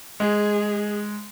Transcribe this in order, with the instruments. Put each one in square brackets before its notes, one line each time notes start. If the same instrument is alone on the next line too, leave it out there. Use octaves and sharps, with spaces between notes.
[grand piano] G#3 [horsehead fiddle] G#4